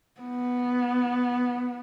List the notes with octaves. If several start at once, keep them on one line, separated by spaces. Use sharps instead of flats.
B3